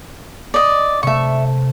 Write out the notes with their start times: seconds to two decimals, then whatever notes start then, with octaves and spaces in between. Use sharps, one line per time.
0.54 D5 D#5
1.03 C3 A3 E5 C#6